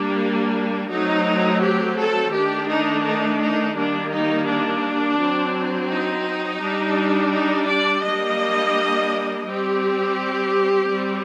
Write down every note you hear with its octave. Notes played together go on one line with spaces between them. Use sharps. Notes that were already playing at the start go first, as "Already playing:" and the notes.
Already playing: G3 A#3 D4
F#3 A3 C4 D#4
G4
A4
D#3 A3 D4 G4
D#4
D#4
D#4
D#3 G3 A#3 D4
D#4
D4
F#3 C4
D#4
G3 D4
D#4
D5
G3 A#3 D4 D#5
G3 C4 G4
G3 C4